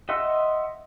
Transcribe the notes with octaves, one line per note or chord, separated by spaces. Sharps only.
D#5 E5 F#5 C6 E6